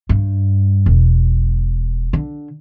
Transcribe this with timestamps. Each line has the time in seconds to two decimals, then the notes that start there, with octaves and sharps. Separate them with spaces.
0.09 G2
0.86 E1
2.13 D3